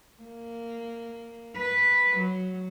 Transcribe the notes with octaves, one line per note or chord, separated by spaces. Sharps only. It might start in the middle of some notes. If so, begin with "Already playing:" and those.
A#3
B4
F#3